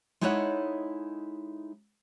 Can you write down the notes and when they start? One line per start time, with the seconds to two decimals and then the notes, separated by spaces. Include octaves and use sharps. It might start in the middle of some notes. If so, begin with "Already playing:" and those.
0.21 G#3 D#4 E4 A4 C#5 F#5